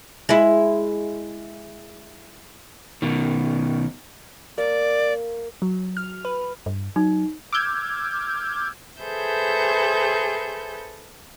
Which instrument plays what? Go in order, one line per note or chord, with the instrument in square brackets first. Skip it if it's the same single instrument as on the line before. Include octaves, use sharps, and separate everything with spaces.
[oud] G#3 E4
[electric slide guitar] B2 D#3
[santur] A#3 [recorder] D5
[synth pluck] F#3
F6
B4
[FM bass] G2
[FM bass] F#3 [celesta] D#4
[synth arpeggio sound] D6 E6 F6 G6 G#6
[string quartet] G#4 A4 B4 C5 E5 G6